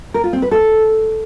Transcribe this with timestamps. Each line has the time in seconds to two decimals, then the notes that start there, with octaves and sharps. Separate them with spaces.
0.14 A#4
0.24 F4
0.33 C4
0.42 B4
0.51 A4